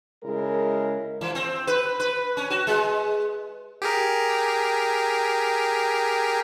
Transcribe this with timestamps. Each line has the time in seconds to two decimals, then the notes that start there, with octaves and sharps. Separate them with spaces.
0.23 C#3 G#3 E4 A#4
1.21 E3
1.35 C4
1.67 B4
2.00 B4
2.37 C#4
2.50 F#4
2.67 G#3
3.82 G4 G#4 A#4